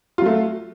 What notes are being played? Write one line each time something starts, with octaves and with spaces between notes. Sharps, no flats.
F#3 A3 F4